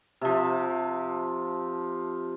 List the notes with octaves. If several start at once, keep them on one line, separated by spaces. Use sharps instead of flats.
C3 F3